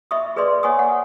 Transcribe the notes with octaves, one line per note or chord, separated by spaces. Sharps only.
D#5 E5 B5 C#6 D#6
G#4 B4 D5 D#5 C6
C#5 D#5 F#5 G#5 C#6 D#6
F#5